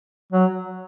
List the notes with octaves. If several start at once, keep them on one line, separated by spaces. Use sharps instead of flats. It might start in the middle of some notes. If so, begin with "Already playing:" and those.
F#3